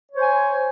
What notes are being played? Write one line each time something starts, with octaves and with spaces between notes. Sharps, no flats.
C5 C#5 G#5